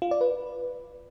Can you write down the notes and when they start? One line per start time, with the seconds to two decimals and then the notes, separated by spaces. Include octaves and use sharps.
0.02 F4
0.11 D5
0.21 B4